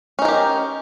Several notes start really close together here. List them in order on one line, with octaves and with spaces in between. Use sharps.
C#4 D#4 A#4 G4